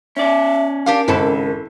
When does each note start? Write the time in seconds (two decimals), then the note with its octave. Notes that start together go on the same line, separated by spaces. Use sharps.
0.17 C#4 D5 E5
0.86 D4 G4 A#4 F5
1.08 G#1 C#3 E4 A4 A5